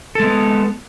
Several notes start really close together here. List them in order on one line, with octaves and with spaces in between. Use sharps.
A4 G#3 B3